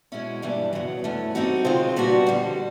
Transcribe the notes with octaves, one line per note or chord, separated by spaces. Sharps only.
B2 G#3 C#4 E4
G2 E3 G3 A#3 D4
F#2 C#3 F#3 B3
G2 E3 A3 C#4
G3 C4 D#4 F#4 A4
C#3 F3 G#3 C4 F4
A#2 G3 B3 D4 F#4
F2 D3 G3